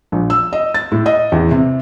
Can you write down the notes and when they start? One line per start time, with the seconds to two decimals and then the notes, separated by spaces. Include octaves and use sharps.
0.12 A#1
0.30 E6
0.53 D#5
0.74 A6
0.92 A2
1.06 D#5
1.32 E2
1.51 C3